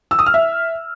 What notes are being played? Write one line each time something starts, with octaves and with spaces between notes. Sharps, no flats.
E6
D#6
F6
E5